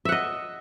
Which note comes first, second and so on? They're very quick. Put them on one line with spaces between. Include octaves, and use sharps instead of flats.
E5 F#5 D#5